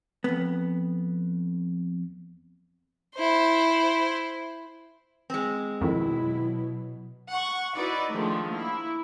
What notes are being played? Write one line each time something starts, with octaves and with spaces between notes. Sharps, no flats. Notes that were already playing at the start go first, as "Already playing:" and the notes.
F2 B3
E4 C5
G#3 C4
F2 B2 D#3 F#3 E4
F#5 C#6
D#4 E4 F#4 B4 D5
D3 D#3 F3 G#3 A3
A#3 E4